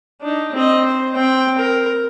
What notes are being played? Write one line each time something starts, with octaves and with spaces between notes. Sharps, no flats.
D4 D#4
C4 D#5
C5
C4 G5
A#4